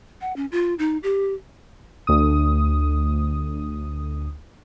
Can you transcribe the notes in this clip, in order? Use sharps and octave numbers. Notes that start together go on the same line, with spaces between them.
F#5
C#4
F4
D#4
G4
D2 D#6